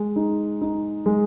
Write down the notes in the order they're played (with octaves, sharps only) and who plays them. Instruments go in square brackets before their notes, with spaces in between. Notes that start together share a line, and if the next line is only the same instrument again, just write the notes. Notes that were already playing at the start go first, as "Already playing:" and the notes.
Already playing: [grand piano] G#3
D#4
D#4
G#3